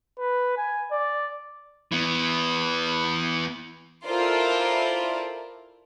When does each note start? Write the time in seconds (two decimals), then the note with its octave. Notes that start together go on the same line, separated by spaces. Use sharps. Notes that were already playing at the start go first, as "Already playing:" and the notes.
0.18 B4
0.57 G#5
0.92 D5
1.92 E3 B3
4.07 E4 F4 A4 A#4 C5 D5